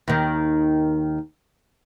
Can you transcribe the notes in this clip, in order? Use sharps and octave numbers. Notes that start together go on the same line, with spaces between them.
D#2 D#3